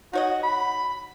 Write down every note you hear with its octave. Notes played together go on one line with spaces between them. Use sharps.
D#4 F#4 C#5 D#5
B5